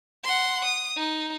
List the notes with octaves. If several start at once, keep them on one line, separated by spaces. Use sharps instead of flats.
F#5 C6
D#6
D#4